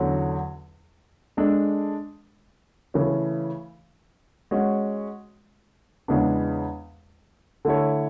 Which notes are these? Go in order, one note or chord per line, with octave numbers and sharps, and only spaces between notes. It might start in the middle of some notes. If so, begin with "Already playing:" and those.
Already playing: E2 D3 F#3 C#4
G#3 D4 A4 D5
C#3 E3 A3 C#4
G#3 C#4 F#4
E2 C#3 G#3 B3 D4
D3 A3 E4 A4 C#5